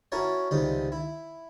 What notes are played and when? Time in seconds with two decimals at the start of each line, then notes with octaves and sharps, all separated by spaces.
0.12 C#4 E4 F#4 A#4 C#5 A5
0.51 C#2 C3 D#3 G3 D#6
0.92 E4